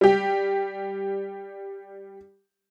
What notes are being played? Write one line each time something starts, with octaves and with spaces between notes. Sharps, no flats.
G3 G4